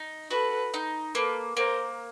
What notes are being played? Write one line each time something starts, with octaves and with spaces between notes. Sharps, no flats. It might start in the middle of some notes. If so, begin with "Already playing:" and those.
Already playing: D#4
F#4 A4 B4
D#4
A#3 A4 B4
A#3 A#4 C5